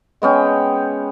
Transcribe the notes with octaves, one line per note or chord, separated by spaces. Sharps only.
G#3 B3 C#4 G5